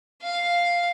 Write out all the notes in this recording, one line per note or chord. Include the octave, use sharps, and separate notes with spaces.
F5